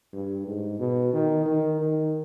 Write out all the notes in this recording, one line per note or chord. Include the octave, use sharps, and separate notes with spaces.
G2
G#2
B2
D#3
D#3
D#3